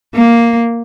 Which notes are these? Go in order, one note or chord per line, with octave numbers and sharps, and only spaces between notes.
A#3